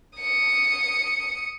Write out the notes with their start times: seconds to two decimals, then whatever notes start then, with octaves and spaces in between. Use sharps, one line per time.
0.19 D#6 C#7